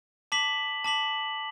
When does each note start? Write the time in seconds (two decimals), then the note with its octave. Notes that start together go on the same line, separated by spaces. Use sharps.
0.32 A5 D6 B6 F#7
0.84 A5 D6 B6 F#7